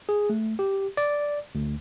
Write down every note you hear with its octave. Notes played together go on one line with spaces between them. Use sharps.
G#4
A3
G4
D5
D2